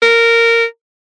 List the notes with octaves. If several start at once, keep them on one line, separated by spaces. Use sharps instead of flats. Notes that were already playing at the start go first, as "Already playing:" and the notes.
A#4